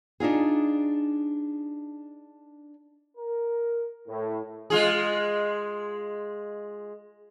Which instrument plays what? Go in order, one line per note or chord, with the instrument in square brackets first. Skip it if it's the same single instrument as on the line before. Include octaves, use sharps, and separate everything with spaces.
[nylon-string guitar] D4 D#4 F4 G#4
[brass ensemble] A#4
A2
[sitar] G#3 F4 G#4